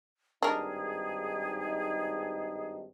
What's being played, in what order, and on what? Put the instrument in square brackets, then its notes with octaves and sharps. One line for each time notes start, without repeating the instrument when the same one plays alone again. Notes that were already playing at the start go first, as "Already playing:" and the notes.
[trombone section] G#1 G2 D#4 [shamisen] D4 A#4 [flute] G#4